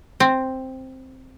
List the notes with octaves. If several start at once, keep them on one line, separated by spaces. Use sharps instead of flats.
C4